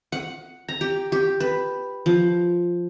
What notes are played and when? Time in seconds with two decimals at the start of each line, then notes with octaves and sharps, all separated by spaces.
0.12 F#5
0.68 A#5
0.81 G4
1.12 G4
1.40 B4
2.06 F3